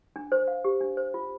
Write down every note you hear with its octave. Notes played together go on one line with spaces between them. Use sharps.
D4
C5
F5
G4
D4
C5
F4